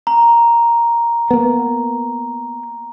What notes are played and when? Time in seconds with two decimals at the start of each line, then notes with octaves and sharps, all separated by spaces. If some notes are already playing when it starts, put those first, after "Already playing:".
0.07 A#5
1.31 A#3 B3